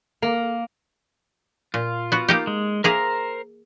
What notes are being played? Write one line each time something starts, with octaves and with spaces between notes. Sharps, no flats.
A#3
A#2 F4
B3 F#4
A#3 D#4 G4
G#3
A#3 G#4 A#4 C5 E5 A#5